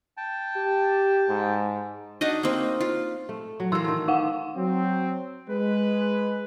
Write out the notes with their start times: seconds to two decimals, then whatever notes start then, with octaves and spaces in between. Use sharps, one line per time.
0.17 G5 A5
0.56 G4
1.29 G#2
2.21 D4 D#4 F#4 D#5
2.43 A#3 C4
2.81 F4
3.29 A3
3.60 F#3
3.72 E3 A#3 C6 E6
3.84 D#3 A3
4.08 D#4 F5 F#5
4.55 F#3 C4
5.49 G#3 B4